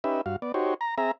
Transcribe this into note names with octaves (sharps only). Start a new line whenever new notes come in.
C#4 D#4 G4 B4 E5
G2 F#4 F5
B3 D5
D#4 F#4 G4 C5 C#5
A#5
C4 G#4 E5 A#5